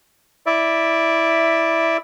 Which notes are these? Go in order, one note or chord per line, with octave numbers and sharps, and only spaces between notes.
E4 D5 E5